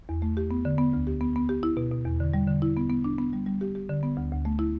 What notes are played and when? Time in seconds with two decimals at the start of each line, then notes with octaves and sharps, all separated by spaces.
0.09 E2
0.22 A3
0.37 G4
0.51 B3
0.65 D3
0.78 B3
0.93 D2
1.07 G4
1.21 B3
1.36 B3
1.49 G4
1.63 E4
1.77 B2
1.91 B2
2.05 E2
2.20 D3
2.33 G3
2.48 D3
2.62 E4
2.77 B3
2.90 B3
3.04 D4
3.18 B3
3.33 G3
3.46 G3
3.61 G4
3.75 G4
3.89 D3
4.03 B3
4.17 D2
4.31 D2
4.45 A3
4.59 E4